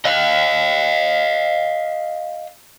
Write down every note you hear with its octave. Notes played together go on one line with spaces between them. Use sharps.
D#5 F5